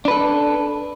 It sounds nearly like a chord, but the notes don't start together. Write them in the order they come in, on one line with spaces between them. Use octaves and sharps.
D4 B4 A4